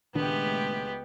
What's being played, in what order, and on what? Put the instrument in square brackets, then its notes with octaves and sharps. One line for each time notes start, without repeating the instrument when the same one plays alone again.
[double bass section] C#2 G#3 A3 [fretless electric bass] A#2 D#3 D4 [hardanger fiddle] B3 G4